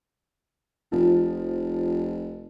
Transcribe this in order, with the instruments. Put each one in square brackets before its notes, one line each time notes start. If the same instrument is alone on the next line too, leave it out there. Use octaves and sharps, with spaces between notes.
[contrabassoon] F1 [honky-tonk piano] F3